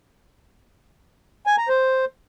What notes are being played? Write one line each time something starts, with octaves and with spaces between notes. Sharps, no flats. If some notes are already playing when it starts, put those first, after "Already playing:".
G#5
A#5
C5